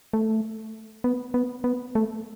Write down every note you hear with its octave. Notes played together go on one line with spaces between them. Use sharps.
A3
B3
B3
B3
A3